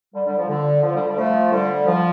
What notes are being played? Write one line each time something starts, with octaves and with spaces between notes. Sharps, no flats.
D3 G3
D3 G3
F3
D3
F3
D3 G3
D3 G3
F3 A3
D3 G3
F3